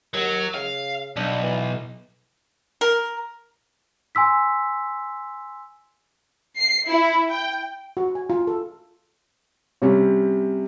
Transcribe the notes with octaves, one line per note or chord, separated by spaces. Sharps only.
D#2 F#3
C#3 F5
B1 D4
E3
A#4
G#5 C6 E6 B6
C7
E4
G5
F#4
G#5
F4
A4
C3 G3 C#4